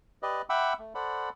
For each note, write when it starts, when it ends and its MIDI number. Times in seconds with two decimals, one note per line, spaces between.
0.23 0.42 67
0.23 0.42 71
0.23 0.42 74
0.23 0.42 75
0.50 0.73 76
0.50 0.73 78
0.50 0.73 79
0.50 0.73 83
0.50 0.73 86
0.50 0.73 88
0.79 0.93 57
0.95 1.29 69
0.95 1.29 72
0.95 1.29 74
0.95 1.29 78
0.95 1.29 83